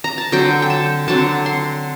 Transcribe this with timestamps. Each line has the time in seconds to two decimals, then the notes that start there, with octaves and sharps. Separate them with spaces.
0.04 A#5
0.18 A5
0.32 D3 F#3 C4 G5
0.62 G5
0.70 A5
1.08 D3 F#3 C4 A5
1.46 C6